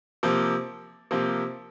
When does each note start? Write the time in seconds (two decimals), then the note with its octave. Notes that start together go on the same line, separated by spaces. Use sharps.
0.23 C3 F3 A#3
1.11 C3 F3 A#3